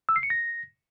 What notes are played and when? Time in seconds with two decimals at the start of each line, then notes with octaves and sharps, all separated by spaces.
0.09 E6
0.16 C7
0.23 C#7
0.30 A#6